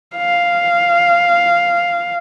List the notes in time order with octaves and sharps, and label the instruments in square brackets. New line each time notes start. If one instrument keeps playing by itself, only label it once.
[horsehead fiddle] F5